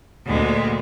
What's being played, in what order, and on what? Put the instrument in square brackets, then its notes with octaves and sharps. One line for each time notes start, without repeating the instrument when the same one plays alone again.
[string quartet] D2 A#2 G#3 B3